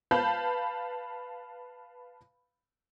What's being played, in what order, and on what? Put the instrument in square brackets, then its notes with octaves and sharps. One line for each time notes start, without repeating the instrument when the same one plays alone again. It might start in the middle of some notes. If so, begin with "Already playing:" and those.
[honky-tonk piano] B4 F5 A5 B5 G6